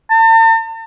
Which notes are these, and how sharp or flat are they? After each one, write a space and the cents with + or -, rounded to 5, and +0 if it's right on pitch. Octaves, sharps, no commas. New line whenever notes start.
A5 +45